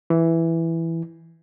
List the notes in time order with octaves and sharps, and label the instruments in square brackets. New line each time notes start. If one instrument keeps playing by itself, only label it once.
[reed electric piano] E3